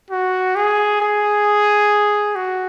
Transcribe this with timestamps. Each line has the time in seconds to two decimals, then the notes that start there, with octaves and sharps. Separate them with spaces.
0.10 F#4
0.56 G#4
1.01 G#4
2.36 F#4